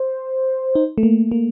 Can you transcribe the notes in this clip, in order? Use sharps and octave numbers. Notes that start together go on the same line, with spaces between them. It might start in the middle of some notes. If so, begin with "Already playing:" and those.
Already playing: C5
D#4
A3
A#3
A#3